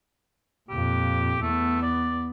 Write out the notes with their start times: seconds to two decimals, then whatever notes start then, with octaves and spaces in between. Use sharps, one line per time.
0.69 F2 A#2 G4
1.42 E2 A3 B3
1.82 D5